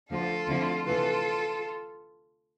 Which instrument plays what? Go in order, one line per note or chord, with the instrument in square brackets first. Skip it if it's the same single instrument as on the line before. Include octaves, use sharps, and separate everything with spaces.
[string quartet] D2 D3 F3 F4 A4
D2 D3 F3 C4 E4
D2 C3 E3 F4 A4